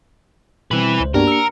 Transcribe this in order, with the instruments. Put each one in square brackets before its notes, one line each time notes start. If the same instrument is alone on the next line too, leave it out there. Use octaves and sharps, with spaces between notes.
[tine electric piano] B2 G3 C4 [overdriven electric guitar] E3 B4
[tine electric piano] C#2 C5
[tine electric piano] G2 B3 F#4 [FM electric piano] A#3 D4 G4 [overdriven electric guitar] A#4
[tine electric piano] E6 C#7